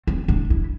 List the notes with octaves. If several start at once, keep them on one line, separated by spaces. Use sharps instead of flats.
C4
D4
E4